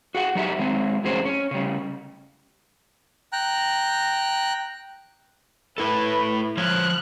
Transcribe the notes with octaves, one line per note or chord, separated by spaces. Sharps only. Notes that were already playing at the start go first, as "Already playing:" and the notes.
F#4 G#4 F#5
F#3 D#4 G4 E5
F#3 G#3 C4
F2 A2 F#3 C#4 G#4 C5
C#4
C#3 G3
G5 A#5 F#6
A3 E4 A4 B4
F3 C5 C#5 F6 F#6